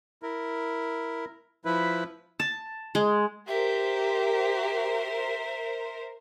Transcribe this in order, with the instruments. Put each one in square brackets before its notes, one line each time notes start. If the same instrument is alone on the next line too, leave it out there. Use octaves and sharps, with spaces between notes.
[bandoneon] E4 A#4
F3 E4 B4
[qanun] A5
G#3
[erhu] G4 [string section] A#4 C5 [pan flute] E5